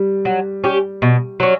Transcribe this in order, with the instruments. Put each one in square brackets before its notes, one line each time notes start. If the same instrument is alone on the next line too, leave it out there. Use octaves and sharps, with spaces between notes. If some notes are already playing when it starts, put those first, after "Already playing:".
Already playing: [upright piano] G3
[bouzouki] F#3
C#4 G4
B2
F#3 C#4